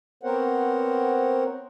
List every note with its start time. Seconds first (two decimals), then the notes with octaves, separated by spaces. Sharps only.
0.23 B3 C4 A#4 C5 C#5 F#5